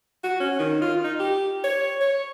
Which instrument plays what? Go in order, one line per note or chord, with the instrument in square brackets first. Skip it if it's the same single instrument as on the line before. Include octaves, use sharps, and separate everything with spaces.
[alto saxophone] F#4
C#4
D#3
F4
D#4
G4
C#5
C#5